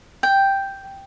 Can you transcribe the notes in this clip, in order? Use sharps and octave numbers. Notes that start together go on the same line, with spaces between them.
G5